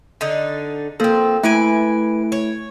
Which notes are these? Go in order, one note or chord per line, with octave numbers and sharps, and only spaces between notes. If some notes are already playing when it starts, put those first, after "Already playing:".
D3 D4 D#4
F3 A#3 C4 A4
E3 A3 E4 B4 G#5 D7
C#5